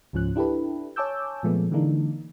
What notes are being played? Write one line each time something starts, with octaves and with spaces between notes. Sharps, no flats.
C#2 G#2 F3 C#4 F#6
D4 E4 G4 A4 B4
C#5 G#5 A5 D6 E6 G6
A#2 F3 G#3 A3 B3
D3 E3 G#3 A#3 D4 D#4